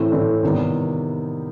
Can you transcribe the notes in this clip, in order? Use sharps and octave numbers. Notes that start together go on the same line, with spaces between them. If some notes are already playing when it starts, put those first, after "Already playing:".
Already playing: A2 E3 A3 C4
A2 E3 A3 C4
C3 D#3 G3 B3